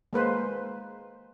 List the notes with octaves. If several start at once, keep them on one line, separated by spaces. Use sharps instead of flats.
G#3 A#3 B4 C5